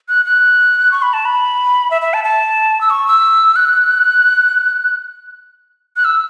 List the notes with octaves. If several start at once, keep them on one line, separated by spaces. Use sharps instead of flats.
F#6
F#6
C#6
B5
A5
B5
E5
E5
A5
A5
E6
C#6
E6
F#6
F#6
E6